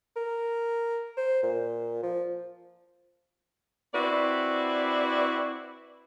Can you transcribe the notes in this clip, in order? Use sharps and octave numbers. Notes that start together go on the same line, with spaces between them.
A#4
C5
A#2
F3
C4 E4 F#4 B4 D5